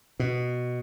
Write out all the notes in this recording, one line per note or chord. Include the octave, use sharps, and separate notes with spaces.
B2